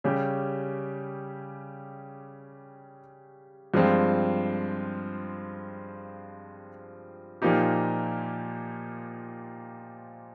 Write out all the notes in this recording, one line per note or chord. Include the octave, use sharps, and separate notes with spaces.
C#3 G3 C#4 G4
G2 F3 G#3 C4 F4
A#2 F3 A#3 D#4 G4